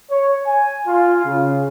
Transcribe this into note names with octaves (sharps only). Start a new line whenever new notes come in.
C#5
G#5
F4
C#3